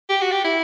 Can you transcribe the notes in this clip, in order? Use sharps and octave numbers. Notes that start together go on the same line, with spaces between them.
G4
F#4
G4
E4